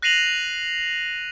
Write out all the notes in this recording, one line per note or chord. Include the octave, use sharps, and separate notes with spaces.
F#6 A#6 C7 D#7 F7 F#7